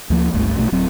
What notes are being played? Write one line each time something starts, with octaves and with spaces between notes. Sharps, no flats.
D2 F3 A#3
G1 C#2 G2 A3
A#1 B2 D#3 A3
D1 F#3 C4